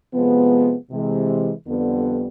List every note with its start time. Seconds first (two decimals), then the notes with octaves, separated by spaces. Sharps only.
0.14 C3 F3 G#3 B3
0.91 C3 E3 G#3
1.67 F2 D3 G3 B3